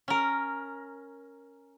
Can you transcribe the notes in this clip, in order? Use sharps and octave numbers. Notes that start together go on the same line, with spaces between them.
C#4 A#4